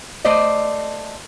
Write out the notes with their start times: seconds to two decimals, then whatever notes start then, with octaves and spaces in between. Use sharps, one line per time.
0.25 A3 C5 D5 D#5